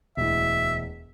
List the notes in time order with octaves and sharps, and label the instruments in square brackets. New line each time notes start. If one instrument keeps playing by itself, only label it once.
[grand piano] E1 D2 E4 [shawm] E5